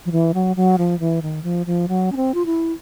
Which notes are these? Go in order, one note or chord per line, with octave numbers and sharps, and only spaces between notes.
F3
E3
F#3
F#3
F3
E3
D#3
F3
F3
F#3
C#4
C4
F4
E4